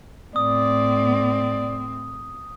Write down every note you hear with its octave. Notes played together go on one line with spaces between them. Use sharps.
A2 C4 D5 D#6